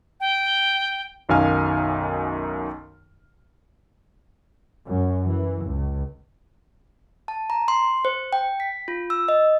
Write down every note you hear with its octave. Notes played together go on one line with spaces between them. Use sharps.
G5
B1 F#2 D#3 F5 G#5 F6
F#2
E3
C#2
A5
A#5
C6
C5
G5
B6
F4
E6
D#5